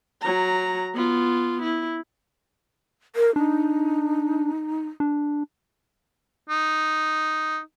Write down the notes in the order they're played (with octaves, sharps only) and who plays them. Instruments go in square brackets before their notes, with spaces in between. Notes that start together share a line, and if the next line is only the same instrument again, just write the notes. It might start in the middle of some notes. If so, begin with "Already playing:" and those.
[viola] F#3 A#5
B3 F4
E4
[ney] A#4
[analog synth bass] D4 [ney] D#4
[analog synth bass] D4
[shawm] D#4